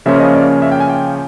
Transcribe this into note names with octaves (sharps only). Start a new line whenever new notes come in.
C#3 F3 A#3 C#4 F4 E5
D#5
D5
E5
G5
G#5
G5